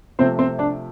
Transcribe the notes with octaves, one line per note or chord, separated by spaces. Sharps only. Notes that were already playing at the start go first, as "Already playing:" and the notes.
C3 F3 A3 C4 C5
C4 C5
D4 D5